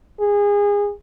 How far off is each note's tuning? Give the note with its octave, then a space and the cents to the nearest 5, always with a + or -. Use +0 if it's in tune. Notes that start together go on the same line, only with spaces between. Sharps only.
G#4 -25